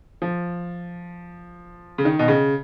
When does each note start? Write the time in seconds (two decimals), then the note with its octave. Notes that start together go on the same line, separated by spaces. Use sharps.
0.22 F3
1.98 C#3
2.05 D#3
2.19 B2
2.28 C#3